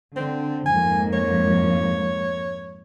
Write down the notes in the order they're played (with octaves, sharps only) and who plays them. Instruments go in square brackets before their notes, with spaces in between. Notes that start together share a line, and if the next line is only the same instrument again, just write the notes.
[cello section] D3 [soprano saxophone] C4
[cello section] F2 G#2 A#3 [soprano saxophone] G#5
[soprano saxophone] C#5